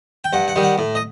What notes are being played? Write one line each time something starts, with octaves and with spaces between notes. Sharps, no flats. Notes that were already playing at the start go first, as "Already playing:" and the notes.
G5
G2 F#5
F#5
D#3 G3
F#5
A2
D#5